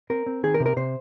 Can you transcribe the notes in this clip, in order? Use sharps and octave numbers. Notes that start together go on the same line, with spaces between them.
C4 A#4
C4
D#3 G#4
A#4
C3
A#4
C3 C5